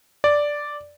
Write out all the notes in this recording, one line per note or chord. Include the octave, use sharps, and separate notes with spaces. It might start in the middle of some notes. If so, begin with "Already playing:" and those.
D5